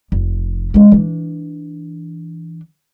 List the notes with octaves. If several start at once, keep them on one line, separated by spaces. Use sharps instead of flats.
F1
G#3 C#4
E3 D4